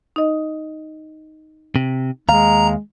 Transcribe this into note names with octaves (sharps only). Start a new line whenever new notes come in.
D#4 D#5
C3
D#2 G#3 F5 A#5